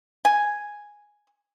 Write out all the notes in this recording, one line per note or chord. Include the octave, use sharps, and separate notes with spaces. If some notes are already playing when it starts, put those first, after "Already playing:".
G#5